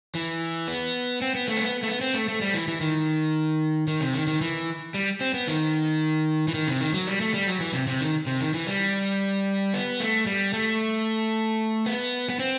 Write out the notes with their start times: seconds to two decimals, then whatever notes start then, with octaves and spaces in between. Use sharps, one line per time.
0.15 E3
0.68 B3
1.22 C4
1.35 B3
1.48 A3
1.57 C4
1.61 B3
1.83 A3
1.88 B3
2.01 C4
2.15 A3
2.28 A3
2.41 G3
2.54 E3
2.68 E3
2.81 D#3
3.87 D#3
4.01 C3
4.14 D#3
4.27 D#3
4.41 E3
4.94 G3
5.21 C4
5.34 B3
5.47 D#3
6.48 E3
6.54 D#3
6.68 C3
6.80 D#3
6.94 F#3
7.07 G3
7.21 A3
7.34 G3
7.47 F#3
7.60 E3
7.74 C3
7.87 C3
8.01 D#3
8.27 C3
8.41 D#3
8.54 E3
8.67 G3
9.74 B3
10.00 A3
10.26 G3
10.53 A3
11.86 B3
12.30 B3
12.40 C4